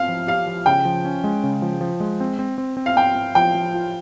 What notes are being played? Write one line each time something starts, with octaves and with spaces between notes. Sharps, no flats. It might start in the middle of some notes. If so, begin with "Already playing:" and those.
Already playing: C4 F5
F3
G4 F5
F3
C#3 G5
F3
C#4
G#3
C#3
F3
F3
G#3
C4
C4
C4
C4
F5
C4 G5
C4
F3 G5
F3
F4